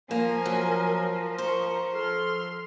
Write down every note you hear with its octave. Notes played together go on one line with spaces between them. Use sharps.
F3 A#3 A#4 C5 G#5
F#3
C5 A#5 C#6
A4 C6 F6